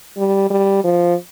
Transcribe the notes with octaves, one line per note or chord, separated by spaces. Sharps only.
G3
G3
F3